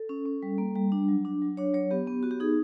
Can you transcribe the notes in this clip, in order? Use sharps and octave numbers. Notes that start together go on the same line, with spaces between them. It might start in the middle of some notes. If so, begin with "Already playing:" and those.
Already playing: A4
C#4
C#4
G3
A#3
G3
D4
F#3
D4
F#3
D4 C#5
F#3 C#5
B3 G4
B3
B3 F#4
G4
D#4 G#4